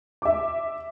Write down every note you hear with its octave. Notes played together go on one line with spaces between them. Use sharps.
E5 D6